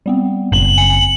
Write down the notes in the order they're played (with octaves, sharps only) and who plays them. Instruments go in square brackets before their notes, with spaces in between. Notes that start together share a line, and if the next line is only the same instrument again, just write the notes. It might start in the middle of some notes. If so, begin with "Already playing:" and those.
[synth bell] G3 B3 C4
[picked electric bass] F#1 [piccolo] F#7
[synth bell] G#5 C#7